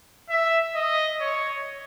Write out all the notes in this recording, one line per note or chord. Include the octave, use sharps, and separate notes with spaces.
E5
D#5
C#5